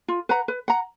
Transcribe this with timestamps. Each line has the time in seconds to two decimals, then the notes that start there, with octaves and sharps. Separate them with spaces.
0.08 F4
0.29 B4 F#5 A#5
0.48 B4
0.68 F#5 A#5